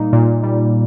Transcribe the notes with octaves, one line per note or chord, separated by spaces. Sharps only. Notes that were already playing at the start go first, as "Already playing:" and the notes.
Already playing: A#2 G3 A#3 D#4
A#2
G3